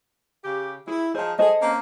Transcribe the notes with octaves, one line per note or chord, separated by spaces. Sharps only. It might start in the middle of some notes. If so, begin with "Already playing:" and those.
C#3 G4
E4 G#4
F3 D#4 G#4 C5 A5
G#4 A4 C5 D#5
A#3 C4 C#4